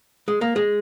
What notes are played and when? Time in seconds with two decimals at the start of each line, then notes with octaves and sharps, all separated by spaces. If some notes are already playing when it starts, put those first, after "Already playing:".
0.28 G#3
0.41 A#3
0.56 G#3